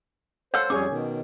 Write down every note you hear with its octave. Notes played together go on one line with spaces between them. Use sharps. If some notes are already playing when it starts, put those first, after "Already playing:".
A4 C5 C#5 F5 F#5 E6
F2 G3 C#4 G#4 C#5 D6
B2 D#3